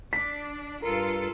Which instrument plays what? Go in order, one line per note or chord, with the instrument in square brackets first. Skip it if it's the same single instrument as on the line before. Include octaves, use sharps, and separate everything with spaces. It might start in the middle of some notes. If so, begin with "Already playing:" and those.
[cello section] D4 [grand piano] B6
[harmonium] G2 [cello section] F4 A4 [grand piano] A#4